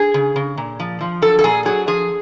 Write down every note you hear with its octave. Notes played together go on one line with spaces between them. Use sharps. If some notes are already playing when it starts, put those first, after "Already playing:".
Already playing: G#4
C#3
C#3
A#2
F3
F3
F#3 A4
A4
A#2 G#4
F#3 G#4
F3 G#4